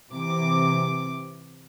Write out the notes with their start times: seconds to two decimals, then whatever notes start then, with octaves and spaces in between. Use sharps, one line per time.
0.13 C3 E3 D6